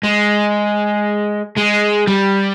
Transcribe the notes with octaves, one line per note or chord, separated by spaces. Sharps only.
G#3
G#3
G3